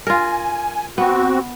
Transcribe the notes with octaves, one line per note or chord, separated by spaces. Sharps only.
F4 A#4 G#5
B3 C4 F#4